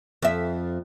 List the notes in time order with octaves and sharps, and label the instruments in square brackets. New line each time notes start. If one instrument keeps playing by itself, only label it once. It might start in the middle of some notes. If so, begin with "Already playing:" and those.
[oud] F2 E5